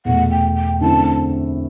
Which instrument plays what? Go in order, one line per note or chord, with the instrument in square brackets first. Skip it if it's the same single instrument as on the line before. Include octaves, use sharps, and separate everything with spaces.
[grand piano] E2 B2 A3 [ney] F#5
[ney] G5
G5
[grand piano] F#2 D3 A3 C4 E4 [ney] A5